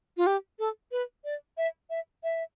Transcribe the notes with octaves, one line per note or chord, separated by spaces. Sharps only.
F4
G4
A4
B4
D5
E5
E5
E5